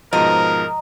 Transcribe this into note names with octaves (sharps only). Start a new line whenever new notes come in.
G#2 B2 F3 A#4 D#5 A#5